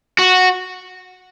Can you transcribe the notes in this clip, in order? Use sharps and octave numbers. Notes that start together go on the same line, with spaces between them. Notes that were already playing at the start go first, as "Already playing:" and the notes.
F#4